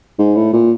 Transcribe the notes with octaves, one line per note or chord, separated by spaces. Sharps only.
G#2
A2
A#2